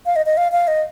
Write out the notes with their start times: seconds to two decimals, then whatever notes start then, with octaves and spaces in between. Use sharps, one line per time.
0.06 F5
0.16 D#5
0.26 D#5
0.37 F5
0.52 F5
0.67 D#5